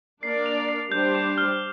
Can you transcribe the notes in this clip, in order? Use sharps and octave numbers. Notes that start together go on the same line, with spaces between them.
A#3 D4 A#4 D5 C7
F7
C7
G3 D4 G4 C5 G6
D6
F6